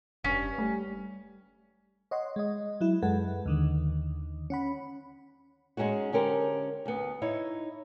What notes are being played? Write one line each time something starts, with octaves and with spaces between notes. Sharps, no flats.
F1 G2 C#4
G3 A3
C#5 D#5 F#5 C6
G#3 D#5
F#3 E4
F#2 G#3 A4 B4 F#5
D#2 D3 D#3
C#4 F#5 B5
G#3 A3 C#4 D#4 F#4
D3 C#4 G4 A#4 C5
D2 B3
D#4 E4 C#5